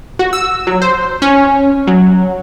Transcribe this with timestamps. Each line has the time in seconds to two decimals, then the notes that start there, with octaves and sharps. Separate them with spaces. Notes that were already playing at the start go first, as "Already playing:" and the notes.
0.19 F#4
0.33 E6
0.67 F#3
0.82 C5
1.22 C#4
1.87 F#3